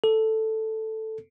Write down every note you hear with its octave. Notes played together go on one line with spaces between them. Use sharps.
A4